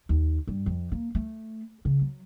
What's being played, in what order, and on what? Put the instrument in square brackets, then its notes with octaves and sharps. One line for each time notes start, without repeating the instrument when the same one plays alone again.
[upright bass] D#2
G2
F2
A#3
A3
C#3
F#3